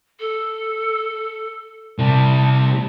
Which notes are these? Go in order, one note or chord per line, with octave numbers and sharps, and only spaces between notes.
A4
C3 G3 A5